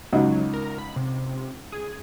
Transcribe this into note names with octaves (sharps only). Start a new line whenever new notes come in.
C#2 F#3 D#4 F#4
A#4
B5
C3
G#4